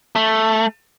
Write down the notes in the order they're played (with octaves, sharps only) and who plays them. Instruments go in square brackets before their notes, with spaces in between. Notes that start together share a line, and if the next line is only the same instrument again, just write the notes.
[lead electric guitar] A3